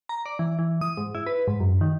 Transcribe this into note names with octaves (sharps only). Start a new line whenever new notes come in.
A#5
D5
E3
E3
D#6
G#2
E4
B4
G#2
F#2
D#3